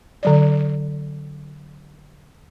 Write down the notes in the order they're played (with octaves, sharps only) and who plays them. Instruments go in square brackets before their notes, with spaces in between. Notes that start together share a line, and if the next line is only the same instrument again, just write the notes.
[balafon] D3 F#3 D5